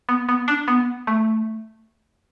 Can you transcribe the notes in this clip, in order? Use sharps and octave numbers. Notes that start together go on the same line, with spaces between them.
B3
B3
D4
B3
A3